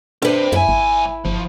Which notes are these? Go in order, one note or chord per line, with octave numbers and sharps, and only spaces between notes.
G2 D4 G4 B4 C5
B1 F#2 E4 B4 G#5
G#1
G1 F3